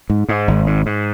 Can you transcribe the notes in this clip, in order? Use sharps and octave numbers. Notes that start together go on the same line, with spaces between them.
G#2
G#2
G#1
G#2
G#2